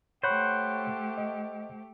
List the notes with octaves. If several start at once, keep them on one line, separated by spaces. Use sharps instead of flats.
A3 G4 C5 C#5 F#5 B5 C#6
D#5